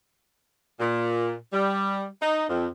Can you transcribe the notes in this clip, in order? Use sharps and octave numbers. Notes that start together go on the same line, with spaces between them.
A#2
G3
D#4
F2